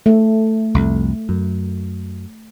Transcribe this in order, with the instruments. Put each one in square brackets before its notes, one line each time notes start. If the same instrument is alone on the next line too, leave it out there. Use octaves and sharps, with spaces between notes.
[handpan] A3
[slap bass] C2 F2
F#2